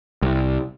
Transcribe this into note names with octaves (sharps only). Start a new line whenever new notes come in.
C2